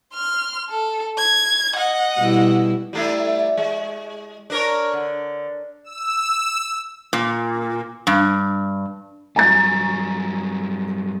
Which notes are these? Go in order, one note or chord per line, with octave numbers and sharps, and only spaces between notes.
C6 F6
A4
G#6
D#5 F#5
B2 G3 E4
G3 A3 E4
G#3
D4 A#4 C#5
D3
E6
A#2
G2
G2 F#3 G#5 A#5 A6